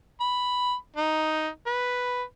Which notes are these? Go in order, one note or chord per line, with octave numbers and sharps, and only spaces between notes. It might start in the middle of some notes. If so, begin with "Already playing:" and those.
B5
D#4
B4